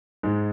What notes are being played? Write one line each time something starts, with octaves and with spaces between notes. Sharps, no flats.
G#2 G#3